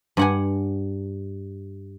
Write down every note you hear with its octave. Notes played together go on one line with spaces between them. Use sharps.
G2 F#5 G#5